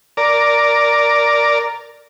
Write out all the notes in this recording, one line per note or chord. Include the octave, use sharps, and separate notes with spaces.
A#4 D5